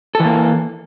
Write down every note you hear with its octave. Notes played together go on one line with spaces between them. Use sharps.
E3 A#3 A4